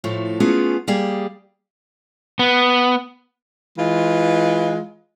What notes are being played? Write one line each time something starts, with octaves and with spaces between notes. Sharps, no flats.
A2 F3 A3
A3 B3 C#4 F4 G#4
G3 A#3 G#4 G5
B3
E3 G#3 F4